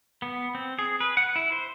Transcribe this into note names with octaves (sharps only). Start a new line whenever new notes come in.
B3
C4
G#4
B4
F#5
E4
C5